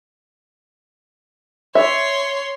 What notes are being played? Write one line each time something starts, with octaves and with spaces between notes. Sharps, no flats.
C#5 E5 C6